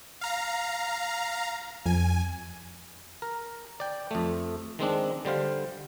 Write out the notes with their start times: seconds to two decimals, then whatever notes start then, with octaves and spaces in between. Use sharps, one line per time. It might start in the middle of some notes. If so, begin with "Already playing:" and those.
0.21 F5 A#5
1.86 F2 G#5
3.22 A#4
3.80 D5 G5
4.11 F2 A3
4.79 D#3 G#3 C4 D4
5.25 D3 G3 C5 F5